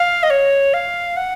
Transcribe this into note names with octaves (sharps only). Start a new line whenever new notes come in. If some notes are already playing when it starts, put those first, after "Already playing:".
Already playing: F5
D#5
C#5
F5
F#5